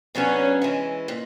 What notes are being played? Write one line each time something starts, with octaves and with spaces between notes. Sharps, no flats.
C#3 F#3 B3 C#4 D4 F#4
E3 G#3 C#4 E4
A#2